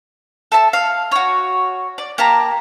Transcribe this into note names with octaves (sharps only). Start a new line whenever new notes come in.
A4 E5 A5
F5
F#4 C#5
D5
A#3 G4 A5 A#5